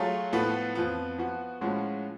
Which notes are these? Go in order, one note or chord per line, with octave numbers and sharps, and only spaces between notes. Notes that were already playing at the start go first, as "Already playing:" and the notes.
Already playing: F#3 A3 F4 G#4 C#5
A2 F3 B3 F#4 A4
F2 F3 B3
F3 B3 F#4
A2 F3 G#3 C#4 F#4